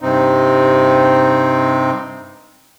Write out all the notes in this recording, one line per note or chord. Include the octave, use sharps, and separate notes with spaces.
G2 C3 C4 D#4